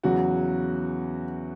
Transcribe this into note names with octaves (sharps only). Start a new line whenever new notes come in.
E2 C#3 F#3 F#4